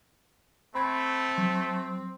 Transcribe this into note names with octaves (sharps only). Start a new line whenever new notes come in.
A3 C4 B5 G#6
F#3